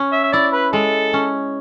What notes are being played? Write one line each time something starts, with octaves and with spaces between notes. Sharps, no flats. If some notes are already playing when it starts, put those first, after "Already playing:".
Already playing: C#4
E5
E5
E4 D5
B4
G#3 A4
C#4